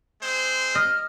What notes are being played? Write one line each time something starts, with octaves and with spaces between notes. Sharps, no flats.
G#3 C4 C5
D#5 F6